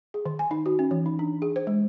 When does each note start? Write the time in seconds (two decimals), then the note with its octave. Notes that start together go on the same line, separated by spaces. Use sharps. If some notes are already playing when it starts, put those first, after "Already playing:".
0.14 G#4
0.26 D#3
0.39 G#5
0.51 D#4
0.66 F#4
0.79 C#4
0.91 E3
1.06 D#4
1.19 D4
1.42 G#4
1.56 C5
1.67 G#3